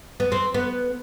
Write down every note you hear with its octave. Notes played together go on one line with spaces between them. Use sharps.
B3
C4
B3